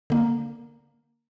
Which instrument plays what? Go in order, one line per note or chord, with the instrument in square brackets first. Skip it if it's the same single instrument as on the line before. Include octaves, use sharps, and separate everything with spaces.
[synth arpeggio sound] D3 A#3